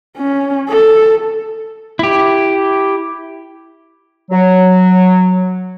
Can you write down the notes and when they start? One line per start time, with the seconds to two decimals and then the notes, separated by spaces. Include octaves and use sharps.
0.17 C#4
0.69 A4
1.99 E4 G4
4.31 F#3